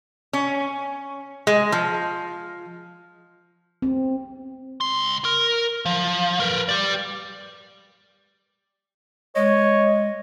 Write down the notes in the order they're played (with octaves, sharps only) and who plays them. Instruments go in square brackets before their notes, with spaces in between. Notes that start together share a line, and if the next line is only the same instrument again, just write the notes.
[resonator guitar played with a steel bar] C#4
G#3
F3
[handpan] C4
[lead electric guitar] C#2 C6
A#4
F3
A#4 B4
G4 D5
[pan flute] G#3 [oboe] C#5 [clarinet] D#5